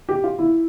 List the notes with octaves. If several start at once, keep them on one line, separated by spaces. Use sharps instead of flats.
G4
F4
E4